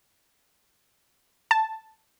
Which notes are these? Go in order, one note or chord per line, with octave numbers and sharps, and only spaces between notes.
A5